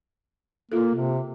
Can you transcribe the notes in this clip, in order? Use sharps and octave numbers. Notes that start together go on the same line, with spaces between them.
A#3 F4 A4
C3